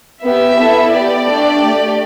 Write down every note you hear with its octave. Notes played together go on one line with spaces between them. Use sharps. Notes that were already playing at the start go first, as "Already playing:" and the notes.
B3 G4 E5
B3 E4 A4
B3 G4 D5
A3 D4 G4
A3 G4